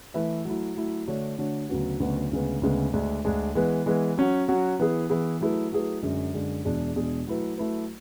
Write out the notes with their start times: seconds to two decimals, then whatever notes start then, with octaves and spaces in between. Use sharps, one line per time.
0.14 E3 A3 E4 B4 E5
0.45 F#3 A3 E4
0.76 F#3 A3 E4
1.07 D3 A3 D4 F#4 C#5
1.38 D3 A3 D4 F#4 C#5
1.69 D2 C#3 F#3 B3 F#4
2.00 D2 C#3 F#3 B3 F#4
2.31 D2 C#3 G#3 B3
2.62 D2 C#3 G#3 B3
2.93 D2 D3 G#3 D4
3.25 D2 D3 G#3 D4
3.55 E3 G#3 B3
3.86 E3 G#3 B3
4.17 F#3 C#4 F#4
4.48 F#3 C#4 F#4
4.79 E3 B3 E4 G#4
5.10 E3 B3 E4 G#4
5.41 F#3 A3 E4 G#4 B4
5.72 F#3 A3 E4 G#4 B4
6.03 F#2 D3 G#3
6.34 F#2 D3 G#3
6.65 E2 B2 G#3 D4 G#4
6.96 E2 B2 G#3 D4 G#4
7.27 F#3 A3 E4 B4
7.58 F#3 A3 E4 B4